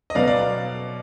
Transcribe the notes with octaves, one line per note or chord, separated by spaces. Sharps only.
D#5
B2 F#3 B3 D5 F5
D5 F5
D5 F5